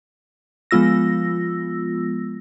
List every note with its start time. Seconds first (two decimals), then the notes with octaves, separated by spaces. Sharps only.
0.71 F3 G#3 B3 F4 E6 A#6